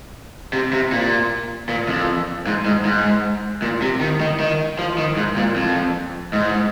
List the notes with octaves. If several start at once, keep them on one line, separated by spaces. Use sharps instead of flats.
C3
C3
A#2
A#2
F2
G#2
G#2
G#2
A#2
C3
D#3
D#3
D#3
F3
D#3
G#2
A#2
F2
G#2